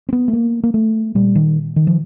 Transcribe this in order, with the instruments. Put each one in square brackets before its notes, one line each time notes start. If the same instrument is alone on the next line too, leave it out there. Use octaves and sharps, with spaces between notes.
[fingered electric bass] C4
B3
A3
A#3
A#3
A3
A#2 G3
D#3
D#3
F3